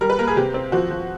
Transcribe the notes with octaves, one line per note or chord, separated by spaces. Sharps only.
G3 A#4
B4
A#3 A#4
G#4
C3 G4
C4
F3 F#4
F3